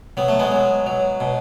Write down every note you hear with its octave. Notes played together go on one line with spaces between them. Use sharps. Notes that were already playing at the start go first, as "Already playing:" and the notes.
F#3 B3
A3
G#3 B3
F#3
F#3
B2